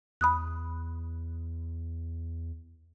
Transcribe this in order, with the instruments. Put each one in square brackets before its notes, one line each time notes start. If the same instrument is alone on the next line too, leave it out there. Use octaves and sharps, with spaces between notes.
[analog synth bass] E2 [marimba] B5 D#6 F#6